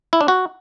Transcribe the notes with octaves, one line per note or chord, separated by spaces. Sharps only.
E4
D4
F#4